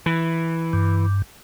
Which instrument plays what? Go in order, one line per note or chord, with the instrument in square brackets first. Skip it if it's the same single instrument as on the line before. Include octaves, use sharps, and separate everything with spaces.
[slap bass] E3
[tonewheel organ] G2